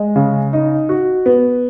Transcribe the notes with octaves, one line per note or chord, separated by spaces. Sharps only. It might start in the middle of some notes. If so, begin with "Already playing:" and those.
Already playing: G#3
C#3
D#4
F#4
B3